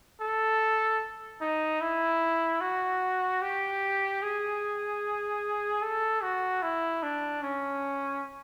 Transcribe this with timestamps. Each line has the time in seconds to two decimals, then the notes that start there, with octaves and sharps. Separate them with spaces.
0.21 A4
1.41 D#4
1.81 E4
2.61 F#4
3.42 G4
4.22 G#4
5.82 A4
6.23 F#4
6.62 E4
7.03 D4
7.43 C#4